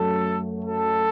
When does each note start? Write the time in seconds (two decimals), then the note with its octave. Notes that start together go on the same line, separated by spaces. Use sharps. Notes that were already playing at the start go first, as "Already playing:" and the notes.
Already playing: F#2 F#3 A3 A4
0.65 A4